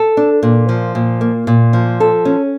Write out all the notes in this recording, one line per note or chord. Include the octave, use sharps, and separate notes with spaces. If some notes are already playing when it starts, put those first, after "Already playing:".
Already playing: A4
D4
A#2
F3
A#2
A#3
A#2
F3
A4
C#4